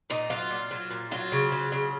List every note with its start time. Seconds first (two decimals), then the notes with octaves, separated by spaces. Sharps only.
0.10 A#2 D#4
0.30 F#3 F4
0.50 A#2
0.71 F#3
0.91 A#2
1.11 F#3 F4
1.32 C#3
1.52 F#3
1.72 C#3